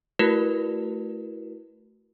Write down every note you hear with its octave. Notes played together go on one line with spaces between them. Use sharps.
A3 E4 F#4 A#4 B4